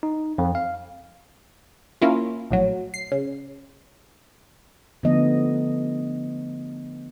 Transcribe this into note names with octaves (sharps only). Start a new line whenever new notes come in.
D#4
F2
F5
A#3 C#4 E4 F4
A#1 A2 F#3
C7
C#3
D3 F3 A3 B3 D#5